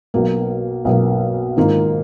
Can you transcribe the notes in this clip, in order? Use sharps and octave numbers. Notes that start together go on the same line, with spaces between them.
B1 B2 A#3
B1 B2 A#3
G#2 D#3 A#3 F4 A#4